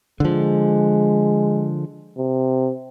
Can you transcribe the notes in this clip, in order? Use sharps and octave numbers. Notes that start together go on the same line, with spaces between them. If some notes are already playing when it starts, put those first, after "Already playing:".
D3 F3 G#3
C3